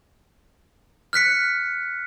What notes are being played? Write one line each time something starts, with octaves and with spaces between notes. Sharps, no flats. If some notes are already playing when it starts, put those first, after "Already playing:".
F6 F#6 B6 C#7